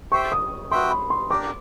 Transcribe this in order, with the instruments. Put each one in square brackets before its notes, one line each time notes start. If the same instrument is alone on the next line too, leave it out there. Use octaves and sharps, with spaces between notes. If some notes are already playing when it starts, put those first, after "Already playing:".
[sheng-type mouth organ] G4 C5 E5 G5 [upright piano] C#6
[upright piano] D#6
[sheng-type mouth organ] F#4 B4 E5 G5 [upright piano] C6
[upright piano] B5
C6
[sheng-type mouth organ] D4 G4 A#4 [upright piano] D6